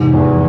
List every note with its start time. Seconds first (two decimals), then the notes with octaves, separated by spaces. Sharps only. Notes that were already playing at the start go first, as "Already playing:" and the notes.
Already playing: F2 G#2 C3 E3
0.13 E2